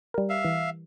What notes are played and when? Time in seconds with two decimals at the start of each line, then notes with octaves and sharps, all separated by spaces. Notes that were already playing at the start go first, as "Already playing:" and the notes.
0.14 G3 A#4
0.29 E5 F5
0.44 E3